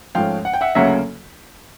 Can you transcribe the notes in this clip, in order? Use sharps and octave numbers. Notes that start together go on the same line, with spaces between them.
G#2 F3 A3 C#4 F5 G5
F#5
G5
E5 F#5
D2 C#3 F#3 A#3 C#4 E5 F#5